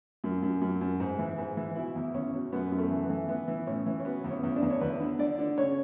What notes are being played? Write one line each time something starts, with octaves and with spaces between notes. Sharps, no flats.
F#2
F#2
F#2
F#2
G#2
E3
G#2
E3
B2 E4
E2
E2 C#4
B2
F#2 B3
F#2
A3
E3
B3
E3
E3 B3
E3
A2 C#4
E3
C#4
B2 B3
E2
C#4
E2
D4
E2
C#5
E2 B4
D3
D3 D5
D3
C#3 C#5